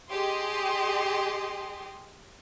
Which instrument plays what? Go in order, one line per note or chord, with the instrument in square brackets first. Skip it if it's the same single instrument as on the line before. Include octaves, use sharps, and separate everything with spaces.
[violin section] G4 G#4 D#5 C6